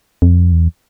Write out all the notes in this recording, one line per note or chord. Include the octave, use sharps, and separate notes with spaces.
F2
E2